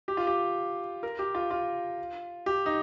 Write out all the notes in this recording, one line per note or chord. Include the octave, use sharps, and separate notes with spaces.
G4
F4
G4
A#4
G4
F4
F4
G4
D#4